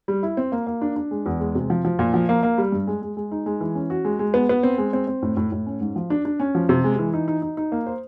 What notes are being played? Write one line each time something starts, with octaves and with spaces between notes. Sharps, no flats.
G3
E4
C4
A#3
A#3
D4
D4
G#3
E2
G#3
C3
F3
F3
A#2
F3
A#3
A#3
G3
G2
G#3
G#3
G#3
D#4
G#3
E3
C#4
F#4
G#3
G#3
B3
B3
C4
G#3
C4
C4
A2
A2
A2
C#4
G#2
F3
D4
D4
C#4
F3
C3
G#3
E3
D#4
D#4
D#4
D#4
A#3
C5